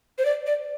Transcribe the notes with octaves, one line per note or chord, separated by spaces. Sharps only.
C5
D5
D5